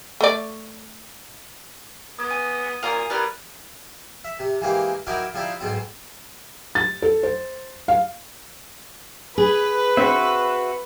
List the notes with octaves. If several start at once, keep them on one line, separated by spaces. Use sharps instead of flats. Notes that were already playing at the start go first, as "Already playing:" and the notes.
A3 D5
B3 D#6
G#5 D#7
A#2 F5 G#5 A#5
G3 E4 A#4 B4
E5
C3
E3 G#3 A#3 G4
F#3 D#4 E4 A#4 G5 D6
F3 G3 C4 D#4 E4
B1 G#2 B2 C4
A6
A4
C5
F5
G#4 B4
C4 F#4 E5